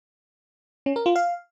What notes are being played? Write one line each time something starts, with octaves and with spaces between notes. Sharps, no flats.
C#4
A#4
F4
F5